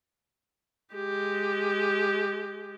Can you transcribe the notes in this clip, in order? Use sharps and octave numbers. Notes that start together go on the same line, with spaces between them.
G#3 G4